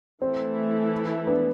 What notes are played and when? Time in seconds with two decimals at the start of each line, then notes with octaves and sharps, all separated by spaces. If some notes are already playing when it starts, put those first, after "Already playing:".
0.22 E3 A3 C4 E4 A4
1.27 B3 D4